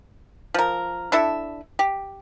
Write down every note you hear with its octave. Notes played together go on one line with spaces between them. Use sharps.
F3 A#4
D4 E4 A4 E5
G4